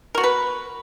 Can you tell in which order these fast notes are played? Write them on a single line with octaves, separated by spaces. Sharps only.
A#4 F#4 B3 B4